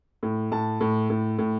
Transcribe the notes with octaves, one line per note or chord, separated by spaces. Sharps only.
A2
A2 A5
A2
A2
A2